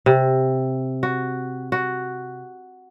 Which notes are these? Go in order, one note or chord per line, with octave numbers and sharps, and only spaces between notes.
C3
F#4
F#4